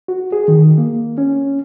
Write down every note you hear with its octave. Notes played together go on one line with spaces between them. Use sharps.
F#4
G#4
D#3
A#3
C#4